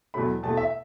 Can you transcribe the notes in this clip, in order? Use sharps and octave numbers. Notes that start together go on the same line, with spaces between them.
E2 B2 F#3 A3 B5
E2 B2 A3 A5
E5